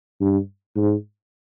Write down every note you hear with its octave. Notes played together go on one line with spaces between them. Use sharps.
G2
G#2